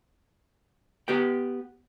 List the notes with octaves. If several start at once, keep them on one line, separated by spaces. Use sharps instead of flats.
B3 G4 B4 G5